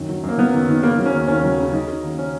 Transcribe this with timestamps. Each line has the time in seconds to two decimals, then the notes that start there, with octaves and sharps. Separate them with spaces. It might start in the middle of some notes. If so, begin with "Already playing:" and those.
Already playing: F#2 D#3
0.09 F#3
0.23 F#2 A#3
0.38 F#3 B3
0.53 D#3
0.68 D#3
0.83 C#3 A#3
0.99 F#3
1.06 C#4
1.13 D#2
1.28 D#2 C#4
1.44 F#3
1.58 C#3
1.72 F#3 D#4
1.88 C#3
2.03 D#2
2.18 C#4